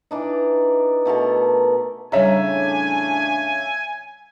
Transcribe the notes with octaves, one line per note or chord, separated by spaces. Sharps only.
E3 D4 D#4
B2 A3 A#4 A5
A2 C#3 G3 D4 C#5 E5 G#5 A#5